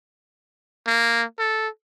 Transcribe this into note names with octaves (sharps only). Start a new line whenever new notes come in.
A#3
A4